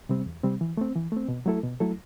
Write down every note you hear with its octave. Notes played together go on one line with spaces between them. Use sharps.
C3 G3 C4
E2
C3 G3 C4
E3
A3 C4
E3
A3 C4
B2
F#3 A3 E4 A4
B2
F#3 A3 E4 A4